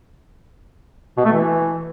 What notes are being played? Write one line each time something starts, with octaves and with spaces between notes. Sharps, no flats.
B2
A3
E3